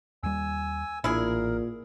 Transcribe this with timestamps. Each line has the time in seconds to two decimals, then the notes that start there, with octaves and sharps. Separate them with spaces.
0.23 D#2 G3 G#5 E6
1.04 A1 A#2 C#4 D4 E4 G#4 A#4